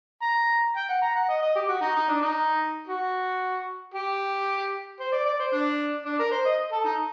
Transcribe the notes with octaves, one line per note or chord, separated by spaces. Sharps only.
A#5
G5
F#5
A#5
F#5
D#5
D#5
G4
F#4
D#4
D#4
D4
D#4
F#4
G4
C5
D5
D5
C5
D4
D4
A#4
C5
D#5
A4
D#4